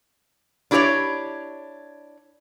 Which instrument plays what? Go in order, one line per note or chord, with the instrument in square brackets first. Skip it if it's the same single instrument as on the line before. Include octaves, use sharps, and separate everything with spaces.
[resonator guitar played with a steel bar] D4 E4 G4 B4 C#5 D5